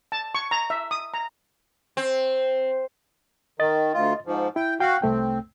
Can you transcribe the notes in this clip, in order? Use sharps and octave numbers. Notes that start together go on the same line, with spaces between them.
A5
C#6
A#5
E5
D#6
A#5
C4
D#3 D#5 A6
D2 F4
G#2 F3
E4 G5
F#4 F5 G5 F#6
C2 A3 C4 G5